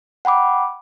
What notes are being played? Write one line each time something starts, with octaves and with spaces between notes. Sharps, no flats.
F#5 G5 B5 D6